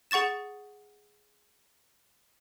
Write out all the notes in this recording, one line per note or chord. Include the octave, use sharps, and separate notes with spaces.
G#4 F#5 C#6 A6 E7